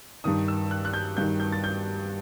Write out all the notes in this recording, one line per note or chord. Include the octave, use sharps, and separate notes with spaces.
G2 D#3 D#6
E6
F#6
F#6
G6
G2 D#3 G6
G6
A6
G6